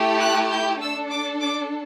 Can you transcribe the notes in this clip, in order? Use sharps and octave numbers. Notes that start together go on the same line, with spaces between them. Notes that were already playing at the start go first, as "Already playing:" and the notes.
Already playing: A3 E4 G4
F#6
G6
D4 A4 E6
D6
D6